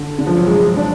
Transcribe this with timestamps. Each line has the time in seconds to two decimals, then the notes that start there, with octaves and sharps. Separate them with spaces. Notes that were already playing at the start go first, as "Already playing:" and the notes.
Already playing: D3
0.19 D3
0.27 F3
0.36 F#3
0.46 G#3
0.57 G#3
0.77 D4